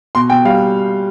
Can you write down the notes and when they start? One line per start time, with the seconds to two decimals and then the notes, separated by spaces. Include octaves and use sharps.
0.15 B2 C6
0.30 B2 G5
0.45 G3 F5